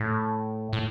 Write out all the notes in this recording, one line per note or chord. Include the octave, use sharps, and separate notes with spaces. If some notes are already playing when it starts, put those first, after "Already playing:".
Already playing: A2
A2